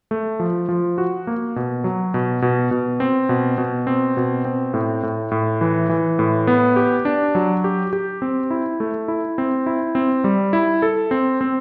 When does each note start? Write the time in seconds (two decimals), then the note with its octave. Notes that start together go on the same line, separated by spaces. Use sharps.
0.11 A3
0.40 F3
0.69 F3
0.98 F#4
1.27 A#3
1.56 B2
1.84 F#3
2.14 B2
2.42 B2
2.71 B2
3.00 C4
3.29 B2
3.58 B2
3.87 C4
4.17 B2
4.45 C4
4.74 A2
5.03 A2
5.31 A2
5.61 E3
5.89 E3
6.19 A2
6.47 B3
6.76 G4
7.05 D4
7.35 F#3
7.64 G4
7.93 G4
8.22 C4
8.51 E4
8.80 A3
9.08 E4
9.38 C4
9.66 E4
9.95 C4
10.24 G3
10.53 E4
10.82 A4
11.11 C4
11.41 C4